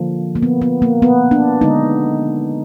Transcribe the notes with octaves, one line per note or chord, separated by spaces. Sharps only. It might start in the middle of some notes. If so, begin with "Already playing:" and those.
Already playing: D3 F3 A#3
A#3
B3
B3
A#3
B3
D4
D3 G#3 D#4